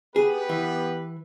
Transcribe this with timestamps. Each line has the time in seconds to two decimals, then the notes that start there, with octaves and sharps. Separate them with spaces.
0.16 B3 G4 G#4 B4
0.49 E3